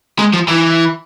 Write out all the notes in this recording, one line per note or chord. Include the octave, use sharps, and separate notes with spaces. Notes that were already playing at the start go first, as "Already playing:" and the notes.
G#3
F3
E3